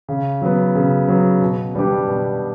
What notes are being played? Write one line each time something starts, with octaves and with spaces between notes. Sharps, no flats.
C#3
F#3 B3
C#3
F#3 B3
B2
G3 B3 D4 G4
B2